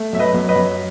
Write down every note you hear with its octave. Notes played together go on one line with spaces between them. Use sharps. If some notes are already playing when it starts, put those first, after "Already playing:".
Already playing: A3
F#2 E5
B4 D#5
F#2
B4 D#5
F#2